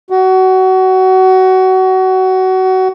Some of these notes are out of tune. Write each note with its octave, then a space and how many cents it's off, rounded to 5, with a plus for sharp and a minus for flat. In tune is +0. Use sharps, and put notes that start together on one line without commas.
F#4 +25